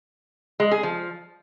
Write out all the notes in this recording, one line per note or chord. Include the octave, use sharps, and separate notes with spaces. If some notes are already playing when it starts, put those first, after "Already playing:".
G#3
G#4
F3